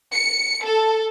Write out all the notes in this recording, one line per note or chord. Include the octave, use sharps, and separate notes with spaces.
C#7
A4